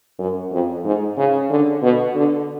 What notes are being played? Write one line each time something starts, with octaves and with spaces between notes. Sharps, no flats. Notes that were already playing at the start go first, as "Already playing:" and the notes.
F#2
F2
G#2
C#3
D3
B2
D3